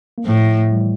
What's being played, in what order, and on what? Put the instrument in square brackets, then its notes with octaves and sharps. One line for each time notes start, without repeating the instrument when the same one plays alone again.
[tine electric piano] A#3
[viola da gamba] A2 [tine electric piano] F3 A3
[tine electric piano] E3 G3